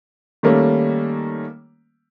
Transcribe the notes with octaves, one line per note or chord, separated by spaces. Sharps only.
D#3 G3 A3 A#3 C#4